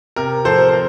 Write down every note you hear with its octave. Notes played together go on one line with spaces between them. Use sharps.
C3 A#4
F3 A4 C5
C5
A#4